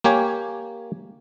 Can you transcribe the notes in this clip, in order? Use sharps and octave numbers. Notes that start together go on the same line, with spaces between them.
A#3 G4 C#5 G#5